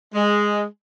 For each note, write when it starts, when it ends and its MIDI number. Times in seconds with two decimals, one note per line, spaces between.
0.15 0.63 56